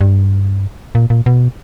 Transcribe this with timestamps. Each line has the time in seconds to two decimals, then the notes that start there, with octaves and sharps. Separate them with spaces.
0.01 G2
0.95 A#2
1.10 A#2
1.26 B2